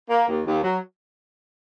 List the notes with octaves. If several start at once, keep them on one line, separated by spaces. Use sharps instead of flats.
A#3
D#2
D#2
F#3